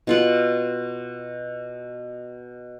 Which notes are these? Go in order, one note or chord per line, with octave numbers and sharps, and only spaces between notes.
B2 F4 F#5